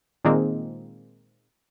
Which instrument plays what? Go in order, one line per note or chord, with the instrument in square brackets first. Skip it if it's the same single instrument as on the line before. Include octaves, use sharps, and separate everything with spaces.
[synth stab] A#2 D#3 G#3 A#3 C4